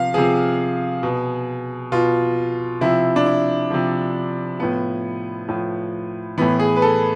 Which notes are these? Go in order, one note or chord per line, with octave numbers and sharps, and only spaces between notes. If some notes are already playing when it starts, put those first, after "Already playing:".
Already playing: C3 F3 F5
C3 F3 G#4
B2
B2 F4
C3 F3 E4
D4
E4
C3 F3
A2 F3 B3
A2 F3
A2 E3 B3
G#4
B4
A4